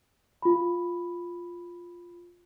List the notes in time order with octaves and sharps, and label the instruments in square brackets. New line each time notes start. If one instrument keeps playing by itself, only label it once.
[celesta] F4 B5